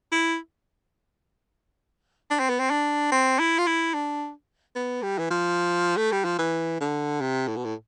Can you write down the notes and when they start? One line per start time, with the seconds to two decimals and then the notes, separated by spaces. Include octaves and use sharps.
0.12 E4
2.31 D4
2.39 C4
2.49 B3
2.59 C4
2.70 D4
3.12 C4
3.39 E4
3.59 F4
3.67 E4
3.94 D4
4.76 B3
5.02 G3
5.18 E3
5.30 F3
5.97 A3
6.12 G3
6.25 F3
6.38 E3
6.80 D3
7.21 C3
7.48 A2
7.56 B2
7.65 A2